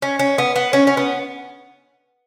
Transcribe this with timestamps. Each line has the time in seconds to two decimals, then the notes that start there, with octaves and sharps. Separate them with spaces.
0.02 C#4
0.19 C#4
0.38 B3
0.56 B3
0.73 C#4
0.87 C#4
0.97 B3